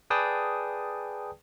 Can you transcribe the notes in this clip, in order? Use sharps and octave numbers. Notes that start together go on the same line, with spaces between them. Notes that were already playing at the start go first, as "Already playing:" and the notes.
G#4 B4 D5 G5 A5 D#6